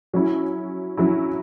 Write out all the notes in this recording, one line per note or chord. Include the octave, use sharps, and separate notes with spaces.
F#3 C#4 E4
F#3 C#4 E4